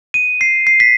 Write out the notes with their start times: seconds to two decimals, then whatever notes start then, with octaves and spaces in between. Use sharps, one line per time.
0.14 D#7
0.41 C7
0.67 C7
0.80 B6